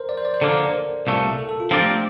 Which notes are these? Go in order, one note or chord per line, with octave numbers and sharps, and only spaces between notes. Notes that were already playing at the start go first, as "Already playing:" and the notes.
Already playing: A#4 C5
D5
C5
D5
C5
D3 F3 A#3 A4
D5
C5
A#4
C2 A#2 A3
A4
A4
F4
F3 C4 D4 G4 A#4 D5
A3
A#3